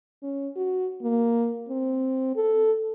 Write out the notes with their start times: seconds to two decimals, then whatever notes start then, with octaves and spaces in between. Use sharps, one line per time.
0.23 C#4
0.56 F#4
1.02 A#3
1.69 C4
2.36 A4